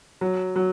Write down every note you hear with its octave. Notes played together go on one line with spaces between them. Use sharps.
F#3
F#3